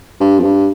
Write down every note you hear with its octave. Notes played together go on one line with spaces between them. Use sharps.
G2
F2
G2